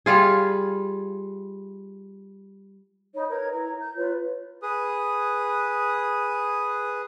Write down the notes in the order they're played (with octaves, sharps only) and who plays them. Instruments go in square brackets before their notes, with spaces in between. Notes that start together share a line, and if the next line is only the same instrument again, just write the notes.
[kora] G3 F4 G#4
[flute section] D#4 C#5 B5
A#4 B4 C#5 G#6
E4 A#5
G6
F4 B4 C#5
[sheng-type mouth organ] G#4 B4 D#6